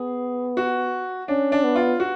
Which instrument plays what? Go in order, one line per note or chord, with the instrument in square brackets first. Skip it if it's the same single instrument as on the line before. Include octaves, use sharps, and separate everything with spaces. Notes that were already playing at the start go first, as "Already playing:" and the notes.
Already playing: [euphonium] B3 [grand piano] G#4
[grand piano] F#4
[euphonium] C#4 [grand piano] D4
[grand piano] D4
[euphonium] B3
[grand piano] F4
F#4